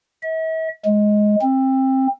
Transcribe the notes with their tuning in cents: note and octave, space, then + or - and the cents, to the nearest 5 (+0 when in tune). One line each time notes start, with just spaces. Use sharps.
E5 -45
G#3 +10
C4 +20